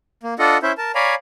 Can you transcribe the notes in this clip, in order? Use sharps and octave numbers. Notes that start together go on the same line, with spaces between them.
A#3
D4 F4 A4 D#5 F#5
C#4 E4 C5 E5
A#4 A5
C#5 D5 F5 G#5 A#5 B5